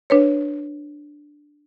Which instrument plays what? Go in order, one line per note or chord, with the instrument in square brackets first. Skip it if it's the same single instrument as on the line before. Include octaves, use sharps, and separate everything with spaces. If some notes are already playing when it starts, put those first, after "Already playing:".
[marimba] D4 B4 C#5